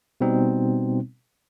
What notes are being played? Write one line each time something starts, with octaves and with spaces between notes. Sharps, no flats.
B2 G3 B3 C4 D#4